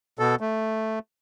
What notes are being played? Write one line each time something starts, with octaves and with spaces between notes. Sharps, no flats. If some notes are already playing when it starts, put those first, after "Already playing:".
B2 A4
A3